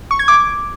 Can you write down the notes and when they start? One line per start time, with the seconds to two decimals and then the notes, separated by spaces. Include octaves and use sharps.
0.11 C#6
0.19 G#6
0.28 D6